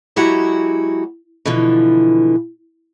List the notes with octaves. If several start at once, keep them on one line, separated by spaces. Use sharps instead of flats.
F#3 G#3 E4 F#4 G4 F#5
B2 D3 E3 F3